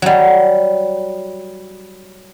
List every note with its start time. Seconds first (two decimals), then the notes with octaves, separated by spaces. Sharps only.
0.02 F#3 G3